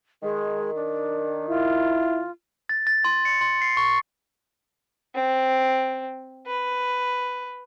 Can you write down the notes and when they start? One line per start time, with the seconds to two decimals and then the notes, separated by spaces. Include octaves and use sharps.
0.22 D#3 G#3
0.75 D4
1.49 E4 F4
2.69 A6
2.87 A6
3.04 C6
3.25 C#7
3.41 C6
3.61 C7
3.77 C#6
5.15 C4
6.47 B4